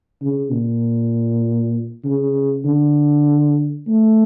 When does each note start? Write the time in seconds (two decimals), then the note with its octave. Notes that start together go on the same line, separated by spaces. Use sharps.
0.21 C#3
0.52 A#2
2.04 C#3
2.65 D3
3.88 A3